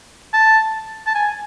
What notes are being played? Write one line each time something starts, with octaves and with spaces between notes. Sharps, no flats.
A5
A5
G#5